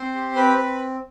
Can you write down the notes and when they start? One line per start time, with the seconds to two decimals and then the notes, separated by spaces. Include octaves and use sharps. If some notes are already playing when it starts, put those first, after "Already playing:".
Already playing: C4 C5 C6
0.14 G4
0.36 C4 B4 B5
0.57 C4